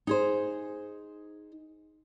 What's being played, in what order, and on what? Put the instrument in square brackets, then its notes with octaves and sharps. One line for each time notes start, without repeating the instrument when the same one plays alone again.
[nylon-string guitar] D#4 G#4 C5